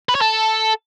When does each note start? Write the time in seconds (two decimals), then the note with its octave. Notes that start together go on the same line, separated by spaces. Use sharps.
0.09 B4
0.15 C#5
0.21 A4